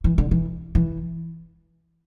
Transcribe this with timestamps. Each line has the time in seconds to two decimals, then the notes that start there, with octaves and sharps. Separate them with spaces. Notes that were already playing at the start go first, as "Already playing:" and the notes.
0.04 E3
0.18 D3
0.31 E3
0.75 E3